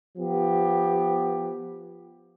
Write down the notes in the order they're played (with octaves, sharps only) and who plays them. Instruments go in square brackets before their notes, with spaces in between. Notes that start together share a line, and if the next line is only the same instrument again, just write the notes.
[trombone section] F3 B3 G4